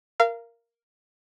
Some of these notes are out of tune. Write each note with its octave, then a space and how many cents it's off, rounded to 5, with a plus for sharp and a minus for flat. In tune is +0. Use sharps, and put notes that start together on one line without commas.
A#4 +0 F5 -25